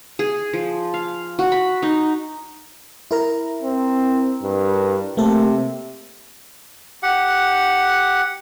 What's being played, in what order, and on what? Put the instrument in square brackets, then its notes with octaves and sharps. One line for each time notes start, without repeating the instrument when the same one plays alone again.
[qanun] G#4
F3
F5
F#4
B5
D#4
[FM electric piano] E4 A#4 A#5
[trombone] C4
G2
[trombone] C3 [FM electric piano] A3 A#3 A4
[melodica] G4 F#5